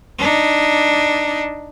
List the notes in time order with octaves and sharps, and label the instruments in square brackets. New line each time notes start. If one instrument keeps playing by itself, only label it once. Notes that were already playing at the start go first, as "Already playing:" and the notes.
[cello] D4 D#4